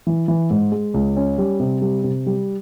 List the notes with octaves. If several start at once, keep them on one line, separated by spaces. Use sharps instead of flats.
E3
E3
G#2
G#3
C#2
C#4
G3
C3
G3
C3
G3